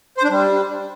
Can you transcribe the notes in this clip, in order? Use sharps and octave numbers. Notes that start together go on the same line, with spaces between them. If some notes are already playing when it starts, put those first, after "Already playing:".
C5
D4
G3